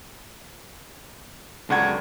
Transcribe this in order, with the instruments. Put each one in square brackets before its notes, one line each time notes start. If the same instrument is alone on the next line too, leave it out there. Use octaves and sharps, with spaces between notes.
[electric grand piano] C#2 F#5 G#6 [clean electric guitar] D3 F#3 G3